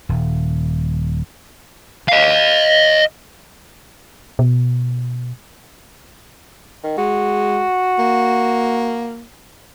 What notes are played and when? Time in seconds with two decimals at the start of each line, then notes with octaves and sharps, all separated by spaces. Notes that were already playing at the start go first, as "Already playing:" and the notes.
0.09 D#1
2.09 D#5 F5
4.39 B2
6.83 D#3
6.98 G#3 F#4
7.99 A#3